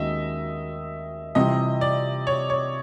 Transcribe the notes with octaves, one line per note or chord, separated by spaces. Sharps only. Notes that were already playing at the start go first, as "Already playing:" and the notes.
Already playing: D#2 D#3 G#3 C#4 F#4 D#5 E5
C3 E3 G3 C4 F4 D#5
D5
C#5
C#5